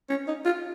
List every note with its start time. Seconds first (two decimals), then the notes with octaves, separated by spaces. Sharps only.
0.10 C#4
0.28 D#4
0.45 F4